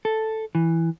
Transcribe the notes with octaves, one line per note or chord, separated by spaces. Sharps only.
A4
E3